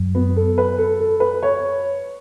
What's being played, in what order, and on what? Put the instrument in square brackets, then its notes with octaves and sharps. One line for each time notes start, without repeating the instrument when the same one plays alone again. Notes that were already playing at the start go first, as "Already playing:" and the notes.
Already playing: [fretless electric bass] F#2 F#3
[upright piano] B3
A4
B4
A4
A4
B4
C#5